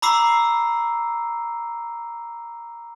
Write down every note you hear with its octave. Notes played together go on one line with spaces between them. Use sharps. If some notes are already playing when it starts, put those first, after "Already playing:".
A#5 B5 D6 E6 C7